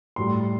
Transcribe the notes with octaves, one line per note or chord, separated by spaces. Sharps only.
A2 G3 C6